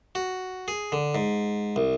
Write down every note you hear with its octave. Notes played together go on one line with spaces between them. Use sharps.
F#4
G#4
D3
G#2
C2